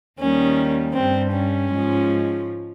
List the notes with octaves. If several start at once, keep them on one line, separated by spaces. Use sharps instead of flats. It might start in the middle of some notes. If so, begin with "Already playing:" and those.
D#2 D#3 G3 C#4
G2 G3 C4
C#4
G#2 F3 G#3